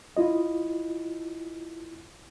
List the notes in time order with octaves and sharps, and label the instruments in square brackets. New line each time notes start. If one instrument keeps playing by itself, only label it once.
[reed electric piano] E4 F4 D#5